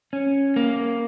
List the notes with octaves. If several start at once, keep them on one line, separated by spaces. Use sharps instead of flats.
C#4
A#3